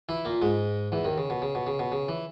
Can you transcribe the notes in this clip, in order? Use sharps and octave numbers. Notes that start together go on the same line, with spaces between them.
E3 E4
A#2 A#3
G#2 G#3
E2 E3
D#2 D#3
C#3
B2
C#3
B2
C#3
B2
C#3
E3